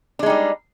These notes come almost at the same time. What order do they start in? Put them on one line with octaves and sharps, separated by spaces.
D4 G#3 D#4 G3